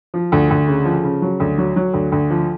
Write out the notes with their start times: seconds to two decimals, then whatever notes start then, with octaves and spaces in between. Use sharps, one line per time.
0.14 F3
0.32 D2
0.51 D2
0.68 C#3
0.85 F3
1.04 C#3
1.22 F#3
1.40 D2
1.58 F#3
1.76 F#3
1.94 D2
2.12 D2
2.30 F3